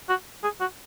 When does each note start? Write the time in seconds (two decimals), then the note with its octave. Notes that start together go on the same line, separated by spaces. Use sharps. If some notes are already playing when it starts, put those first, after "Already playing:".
0.09 F#4
0.44 G#4
0.61 F#4